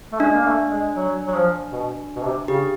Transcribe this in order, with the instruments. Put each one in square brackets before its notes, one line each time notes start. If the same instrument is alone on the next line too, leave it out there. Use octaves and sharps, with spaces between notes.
[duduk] A3
[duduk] G#3 [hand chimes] D4
[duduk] A#3
A3
G#3
F#3
F#3
F3
B2
B2
C3
[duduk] C#3 [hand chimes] G4